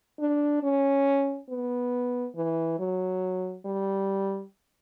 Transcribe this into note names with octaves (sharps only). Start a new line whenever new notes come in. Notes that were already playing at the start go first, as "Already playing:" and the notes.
D4
C#4
B3
E3
F#3
G3